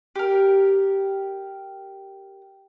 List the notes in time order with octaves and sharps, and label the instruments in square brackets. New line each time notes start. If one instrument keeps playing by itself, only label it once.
[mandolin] G4 A#4